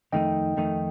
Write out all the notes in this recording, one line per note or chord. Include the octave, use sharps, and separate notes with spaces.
F2 D#3 A3 D#4 D#5 G5
F2 D#3 A3 D#4